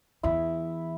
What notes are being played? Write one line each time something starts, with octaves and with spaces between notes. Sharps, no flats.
E2 E4